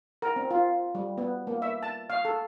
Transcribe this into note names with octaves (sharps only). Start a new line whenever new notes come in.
A#4
C4
F4
G3
B3
A#3
E5
A5
F5
A4